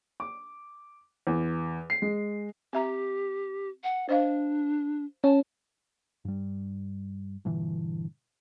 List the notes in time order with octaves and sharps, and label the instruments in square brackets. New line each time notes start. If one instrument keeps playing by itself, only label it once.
[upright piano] D6
E2
C7
G#3
[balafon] C4 E5 A#5 [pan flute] G4
[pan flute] F#5
[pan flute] D4 [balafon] C5 D#5 F5
[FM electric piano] C#4 [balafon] C#5 [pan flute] A5
[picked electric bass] G2 G3
G2 A#2 D3 E3